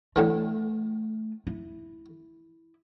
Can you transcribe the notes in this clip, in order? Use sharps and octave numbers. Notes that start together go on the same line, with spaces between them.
A2 D3 E3 A3
E4